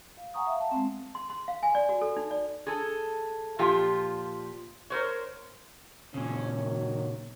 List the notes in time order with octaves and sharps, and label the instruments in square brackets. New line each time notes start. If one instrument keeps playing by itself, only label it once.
[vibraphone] F5
F#5 G#5 A#5 C#6 D#6
E5 F5
A5
G#3 C4
[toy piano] C6
C6
F5
G#5
D5
F#4
A4
D#4
D5
[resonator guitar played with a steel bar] G#4 A4
A#2 F3 F4 G4
A#4 C5 C#5
[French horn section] F2 C#4 [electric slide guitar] A#2 C#3
[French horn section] F#2 D#3 C#5